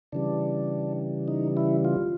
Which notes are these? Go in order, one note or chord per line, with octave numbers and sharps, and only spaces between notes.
C#3 E3 G3 D4
D#4
E4
F4